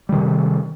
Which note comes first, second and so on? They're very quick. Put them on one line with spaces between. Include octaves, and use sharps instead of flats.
G3 D#3 C3